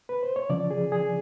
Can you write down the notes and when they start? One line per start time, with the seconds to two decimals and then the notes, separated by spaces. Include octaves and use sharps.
0.09 B4
0.23 C5
0.36 C#5
0.50 C#3 F3 D5
0.71 G#4
0.92 G#4